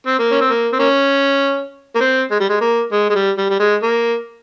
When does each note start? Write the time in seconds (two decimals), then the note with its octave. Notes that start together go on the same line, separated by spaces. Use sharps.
0.07 C4
0.19 A#3
0.31 C#4
0.41 C4
0.49 A#3
0.73 C4
0.79 A#3 C#4
1.95 A#3
2.01 C4
2.31 G#3
2.40 G3
2.49 G#3
2.61 A#3
2.92 G#3
3.10 G#3
3.15 G3
3.37 G3
3.50 G3
3.59 G#3
3.83 A#3